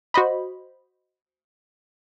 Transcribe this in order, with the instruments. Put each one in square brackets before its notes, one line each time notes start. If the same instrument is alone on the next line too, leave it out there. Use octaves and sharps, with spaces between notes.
[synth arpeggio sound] F#4 C5 D#5 B5